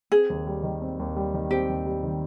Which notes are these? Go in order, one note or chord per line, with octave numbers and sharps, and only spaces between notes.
C4 G#4
D#2
G3
D#3
C4
D#2
G3
D#3
C4 G4
D#2
G3
D#3